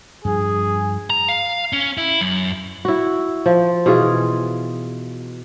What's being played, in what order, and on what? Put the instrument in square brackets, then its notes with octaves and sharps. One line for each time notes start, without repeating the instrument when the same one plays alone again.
[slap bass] G2 F3 [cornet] G#4
[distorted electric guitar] A#5
F5
C#4
E4
F#2
[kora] E4 F#4
F3
B2 E3 F4 G#4